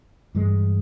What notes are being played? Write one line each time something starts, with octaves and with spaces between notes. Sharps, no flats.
G2 E3 G#3